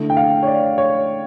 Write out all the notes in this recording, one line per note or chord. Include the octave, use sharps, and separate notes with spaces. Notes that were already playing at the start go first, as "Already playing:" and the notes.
Already playing: D3 A3 E4
G5
F5
C#5
D5
C#5